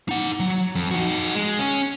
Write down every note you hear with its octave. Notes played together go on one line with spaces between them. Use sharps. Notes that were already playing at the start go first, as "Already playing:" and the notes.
D#4 F#5
F#3
F2
D#4 F#4
G#3
C#4